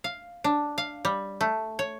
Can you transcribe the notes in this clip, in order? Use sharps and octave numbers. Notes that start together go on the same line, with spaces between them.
F5
D4
F5
G3
A3
C#5